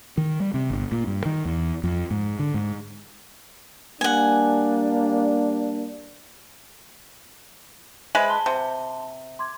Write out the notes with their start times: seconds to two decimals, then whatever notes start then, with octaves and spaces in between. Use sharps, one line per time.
0.18 D#3
0.40 G3
0.54 C3
0.70 G1
0.92 A#2
1.07 G2
1.26 D#3
1.45 E2
1.84 F2
2.11 G#2
2.39 D3
2.54 G#2
4.01 G3 A#3 D4 F#5 G#5
8.15 G#3 B4 C5 E5
8.29 A5 C6 G7
8.46 C3
9.39 C6 D6 G#6